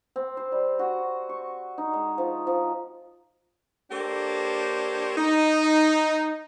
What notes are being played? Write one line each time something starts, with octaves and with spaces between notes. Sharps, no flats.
C4
C5
G3
F#4
C#6
D#4
G#3
F3
F3
A#3 D4 G4 A4 C5 C#5
D#4